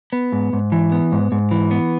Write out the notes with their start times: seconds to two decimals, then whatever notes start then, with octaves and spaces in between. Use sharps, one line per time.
0.13 B3
0.32 G#2
0.53 G#2
0.72 E3
0.92 B3
1.12 G#2
1.32 G#2
1.51 E3
1.71 B3